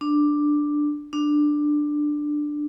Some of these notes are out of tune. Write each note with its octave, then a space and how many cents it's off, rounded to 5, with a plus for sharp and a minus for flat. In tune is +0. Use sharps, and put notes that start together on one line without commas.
D4 +5
D4 +10